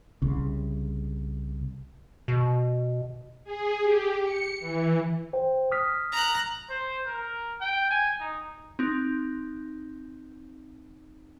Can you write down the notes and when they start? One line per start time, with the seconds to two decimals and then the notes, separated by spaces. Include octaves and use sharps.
0.22 C2 C#3
2.28 B2
3.44 G#4
3.82 G4
4.24 C#7
4.60 E3
5.33 C5 G5
5.72 D#6 F6 B6
6.12 A#5 F#6
6.70 C5
7.06 A#4
7.61 G5
7.90 G#5
8.20 D#4
8.79 C4 D#4